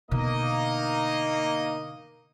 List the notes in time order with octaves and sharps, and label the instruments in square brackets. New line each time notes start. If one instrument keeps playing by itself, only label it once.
[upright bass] B2 D3 [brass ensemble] A#3 D#4 D#5